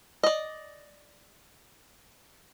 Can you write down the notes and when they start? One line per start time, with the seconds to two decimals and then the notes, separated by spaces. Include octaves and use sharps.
0.23 D5 D#5